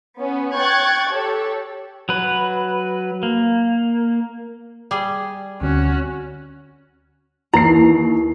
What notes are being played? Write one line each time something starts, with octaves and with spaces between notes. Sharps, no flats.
B3 C#4
G5 C#6 F#6 G#6 A6
G4 A4 C#5
F#3 B4
A#3
G3 G#4
D2 D3 C4 C#4 F#4
D#2 E3 E4 A#5 C7